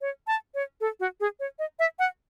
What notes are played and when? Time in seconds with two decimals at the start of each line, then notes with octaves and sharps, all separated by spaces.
0.01 C#5
0.27 A5
0.55 C#5
0.81 A4
1.00 F#4
1.20 G#4
1.40 C#5
1.59 D#5
1.79 E5
1.99 F#5